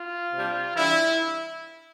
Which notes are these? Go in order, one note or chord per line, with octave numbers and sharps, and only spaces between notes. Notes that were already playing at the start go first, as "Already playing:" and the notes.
Already playing: F4
C3 G3 D4
E3 G3 D4 E4